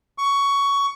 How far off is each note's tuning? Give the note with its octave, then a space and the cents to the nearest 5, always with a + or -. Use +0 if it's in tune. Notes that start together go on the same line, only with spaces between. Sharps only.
C#6 +15